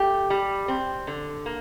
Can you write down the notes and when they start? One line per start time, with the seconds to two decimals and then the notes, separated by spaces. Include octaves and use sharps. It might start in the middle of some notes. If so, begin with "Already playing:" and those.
Already playing: A3 G4
0.30 G3
0.68 C4
1.07 D3
1.46 A#3